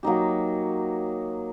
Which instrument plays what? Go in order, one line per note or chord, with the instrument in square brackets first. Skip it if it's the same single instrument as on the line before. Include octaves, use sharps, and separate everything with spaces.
[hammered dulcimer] F#3 A#3 D#4 G4